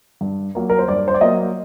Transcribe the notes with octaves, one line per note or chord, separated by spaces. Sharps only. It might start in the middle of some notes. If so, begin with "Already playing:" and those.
G2
F#3 A#3
A#4
C5
G2 D5
C5
D5
F#3 A#3 D#5